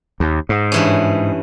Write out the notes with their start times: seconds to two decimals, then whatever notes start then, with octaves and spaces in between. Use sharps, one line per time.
0.20 D#2
0.49 G#2
0.72 G2 E3 C#4